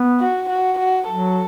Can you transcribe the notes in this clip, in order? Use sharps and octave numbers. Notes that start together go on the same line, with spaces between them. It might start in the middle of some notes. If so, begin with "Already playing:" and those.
Already playing: B3
F#4
F#4
F#4
F#3 A4